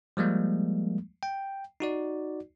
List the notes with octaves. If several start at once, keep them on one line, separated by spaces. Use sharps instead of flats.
F3 G3 G#3 A#3
G5
D#4 F#4 D5